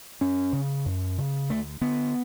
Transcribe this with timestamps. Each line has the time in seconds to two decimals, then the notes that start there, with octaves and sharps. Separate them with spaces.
0.21 F#2 C#4
0.53 C#3
0.86 F#2
1.18 C#3
1.49 D2 A3
1.81 D3 B3